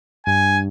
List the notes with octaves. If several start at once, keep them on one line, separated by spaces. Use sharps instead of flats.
G2 G#5